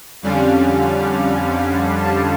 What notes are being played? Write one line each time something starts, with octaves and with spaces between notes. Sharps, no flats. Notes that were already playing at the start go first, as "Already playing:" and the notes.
F2 D3 G3 C#4 F5
A5